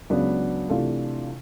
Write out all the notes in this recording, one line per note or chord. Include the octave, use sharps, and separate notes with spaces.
C#2 C#3 F#3 B3 D4
C3 E3 A3 D4 F4